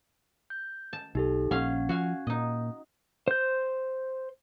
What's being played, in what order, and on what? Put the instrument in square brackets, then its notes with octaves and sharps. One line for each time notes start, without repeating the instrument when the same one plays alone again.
[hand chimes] G6
[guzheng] A5
[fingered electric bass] B1 [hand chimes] D#4 G4 A4
[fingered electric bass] A#1 [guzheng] C#4 F5 [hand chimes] F#5
[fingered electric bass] F3 [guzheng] F#4 F5 G#5
[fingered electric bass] A#2 [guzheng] D#4 D#5
[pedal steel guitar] C5 G6